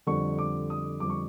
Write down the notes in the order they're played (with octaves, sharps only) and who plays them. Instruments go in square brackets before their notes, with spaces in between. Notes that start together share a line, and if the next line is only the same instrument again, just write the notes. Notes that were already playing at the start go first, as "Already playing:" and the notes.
[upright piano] F2 D3 G3 C#6
D6
D#6
F2 D3 G3 D6
C#6